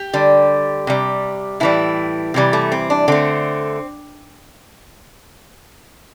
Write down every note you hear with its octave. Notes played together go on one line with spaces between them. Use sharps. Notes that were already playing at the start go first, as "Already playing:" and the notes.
Already playing: G4
D3 G3
C3 G3
A2 E3 G3 E4
C3 E3 G3
A3
C4
D4
D3 A3 C4